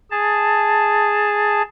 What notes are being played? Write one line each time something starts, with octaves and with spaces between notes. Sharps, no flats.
G#4 A5